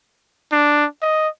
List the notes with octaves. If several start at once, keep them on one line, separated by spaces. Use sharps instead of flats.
D4
D#5